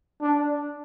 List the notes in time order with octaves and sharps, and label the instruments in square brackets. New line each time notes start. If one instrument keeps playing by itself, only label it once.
[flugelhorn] D4